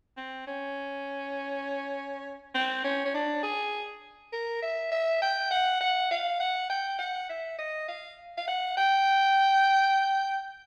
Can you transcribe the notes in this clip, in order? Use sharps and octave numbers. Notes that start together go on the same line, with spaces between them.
C4
C#4
C4
C#4
C#4
D4
G#4
A#4
E5
E5
G5
F#5
F#5
F5
F#5
G5
F#5
E5
D#5
F5
F5
F#5
G5